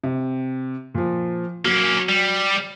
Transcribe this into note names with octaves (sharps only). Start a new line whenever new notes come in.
C3
A#2 F3
F#3 A#3 C#4
G3